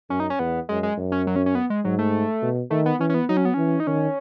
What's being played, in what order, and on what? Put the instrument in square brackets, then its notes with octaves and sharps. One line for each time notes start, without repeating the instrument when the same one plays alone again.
[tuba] F#2 [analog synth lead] C#4
[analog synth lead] D#4
C#4
[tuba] E2 [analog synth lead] B3
[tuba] F#2 [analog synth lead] G#3
[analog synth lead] G#3
[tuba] F#2
[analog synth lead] C#4
F#3
C#4
C#4
B3
G#3
[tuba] G#2 [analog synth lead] F#3
[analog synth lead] A3
[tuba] B2
[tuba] D#3 [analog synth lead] A3
[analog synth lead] B3
[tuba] E3 [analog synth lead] C#4
[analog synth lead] C#4
B3
[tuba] F#3 [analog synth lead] D#4
[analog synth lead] C#4
B3
[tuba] E3 [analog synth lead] C#4
[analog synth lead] D#4
[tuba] D#3 [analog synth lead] C#4